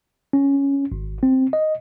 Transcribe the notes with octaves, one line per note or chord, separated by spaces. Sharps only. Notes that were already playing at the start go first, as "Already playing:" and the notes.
C#4
G#1
C4
D#5